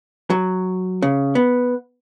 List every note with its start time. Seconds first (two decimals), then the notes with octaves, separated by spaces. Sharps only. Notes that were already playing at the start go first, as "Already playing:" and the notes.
0.30 F#3
1.02 C#3
1.35 B3